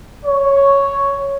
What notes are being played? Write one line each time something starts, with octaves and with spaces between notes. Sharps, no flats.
C#5